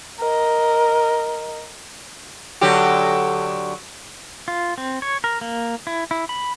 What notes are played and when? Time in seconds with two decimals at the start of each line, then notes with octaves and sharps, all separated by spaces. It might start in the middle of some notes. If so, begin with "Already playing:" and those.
0.20 A#4 D#5
2.61 D3 F#3 G4
4.48 F4
4.78 C4
5.02 C#5
5.24 A#4
5.41 A#3
5.87 E4
6.11 E4
6.29 B5